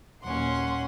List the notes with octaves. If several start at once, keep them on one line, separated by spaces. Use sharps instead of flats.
D#2 A#2 F#3 C#4 F#5 C6